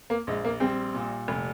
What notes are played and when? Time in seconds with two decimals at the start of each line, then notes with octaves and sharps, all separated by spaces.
0.10 A#3
0.27 A#1 G#3
0.45 A#3
0.60 G3 C4
0.94 A#2
1.28 F1